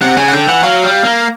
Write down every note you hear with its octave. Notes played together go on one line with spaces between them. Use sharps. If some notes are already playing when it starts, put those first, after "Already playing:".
C3 F#5
C#3 G#5
F#5
D3 G5
E3 F#5
F#3 F5
G3
A#3